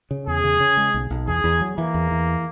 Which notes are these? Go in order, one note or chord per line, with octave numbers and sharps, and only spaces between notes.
C#3
E2 G#4
C#3
C#3
G#3
B1
B1
E2 G#4
E2
F#3
E3 A#3
E2
E3